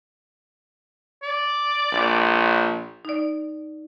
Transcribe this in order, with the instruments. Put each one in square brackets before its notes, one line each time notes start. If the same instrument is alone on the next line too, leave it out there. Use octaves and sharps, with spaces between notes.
[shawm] D5
[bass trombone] A#1
[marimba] D#4 D5